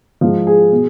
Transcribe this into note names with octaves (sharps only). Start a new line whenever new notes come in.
G#2 F3
G#4
B2